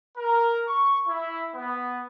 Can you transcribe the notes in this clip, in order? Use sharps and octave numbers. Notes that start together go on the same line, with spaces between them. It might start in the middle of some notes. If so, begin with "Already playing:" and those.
A#4
C#6
E4
B3